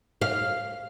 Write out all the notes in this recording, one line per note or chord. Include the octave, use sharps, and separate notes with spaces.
F5